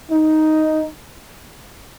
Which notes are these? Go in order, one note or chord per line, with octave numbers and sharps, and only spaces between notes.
D#4